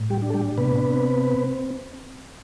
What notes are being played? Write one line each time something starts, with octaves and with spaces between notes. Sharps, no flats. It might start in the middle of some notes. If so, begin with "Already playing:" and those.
Already playing: A2
G3 G4
D4
A4
G3 G4
C3 B3 B4
C4